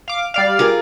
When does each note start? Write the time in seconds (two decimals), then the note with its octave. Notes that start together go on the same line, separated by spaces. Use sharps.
0.08 F5 D6
0.34 G3 D5 F5
0.59 F4 G#4 A#4